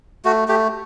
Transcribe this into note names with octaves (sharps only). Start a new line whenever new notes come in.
A3 F#4
A3 G4